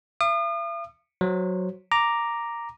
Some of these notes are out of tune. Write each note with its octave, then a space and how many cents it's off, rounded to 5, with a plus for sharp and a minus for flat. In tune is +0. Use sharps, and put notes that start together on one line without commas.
E5 +45 D#6 -40
F#3 +0 C5 +0
A#5 +0 D6 +0